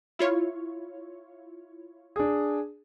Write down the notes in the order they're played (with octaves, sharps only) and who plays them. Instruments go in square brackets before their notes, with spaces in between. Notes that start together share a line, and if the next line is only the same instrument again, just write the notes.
[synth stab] E4 F4 C#5
[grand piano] D4 G#4